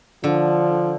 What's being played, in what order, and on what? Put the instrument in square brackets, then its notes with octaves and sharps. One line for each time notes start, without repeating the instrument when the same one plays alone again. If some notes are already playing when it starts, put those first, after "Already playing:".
[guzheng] D3 [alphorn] F3